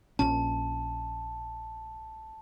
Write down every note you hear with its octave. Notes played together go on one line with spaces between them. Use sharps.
A#1 A#2 C#4 A5